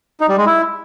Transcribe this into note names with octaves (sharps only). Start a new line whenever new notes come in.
D#4
G3
G#3
E4